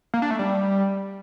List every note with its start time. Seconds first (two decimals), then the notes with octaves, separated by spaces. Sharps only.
0.14 A#3
0.22 D4
0.31 A3
0.39 G3